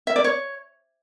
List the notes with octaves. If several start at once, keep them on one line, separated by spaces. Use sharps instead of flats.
E5
D5
C#5